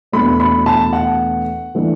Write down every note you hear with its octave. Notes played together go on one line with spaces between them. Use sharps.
E2 B2 A3 D4 B5
B5
A5
F#5
E3 A3 D4